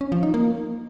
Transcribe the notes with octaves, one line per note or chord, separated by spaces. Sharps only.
C#4
F3
D#4
A#3